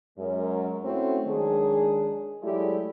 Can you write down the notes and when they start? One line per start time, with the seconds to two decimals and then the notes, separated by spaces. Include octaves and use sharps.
0.18 F#2 G#3 A#4
0.83 A3 C4 C#4 E4 F#4
1.25 D#3 F#3 G#3 D4 G#4
2.42 F#3 G#3 A3 E4 G4 D5